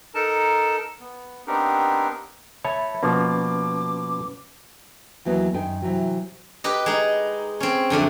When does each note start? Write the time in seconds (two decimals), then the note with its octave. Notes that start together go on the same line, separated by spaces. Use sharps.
0.15 D#4 A4 A#4 A5
1.00 B3
1.47 B3 C4 D4 D#4 G4 A#4
2.65 C#5 E5 A5 B5
3.03 B2 F3 A#3 C#4 B4 D6
5.25 D#2 E3 F#3 B3 F#4
5.54 F#2 D#3 G5 G#5
5.82 C3 E3 F#3
6.64 G4 B4 D#5
6.86 G#3 D#4
7.60 C4 C#4
7.90 F#2 D3 F3 A3